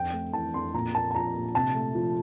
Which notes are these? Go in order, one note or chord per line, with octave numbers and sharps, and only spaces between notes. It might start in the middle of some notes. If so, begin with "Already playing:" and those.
Already playing: F2 C4 G5
A3
E3 A5
F2 C6
A#2 A#5
A#3 A5
A5
F3 A#5
A#2
C3 A5
A3
F3